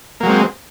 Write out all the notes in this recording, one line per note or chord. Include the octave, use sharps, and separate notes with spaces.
F#3 G#3 A#3 C4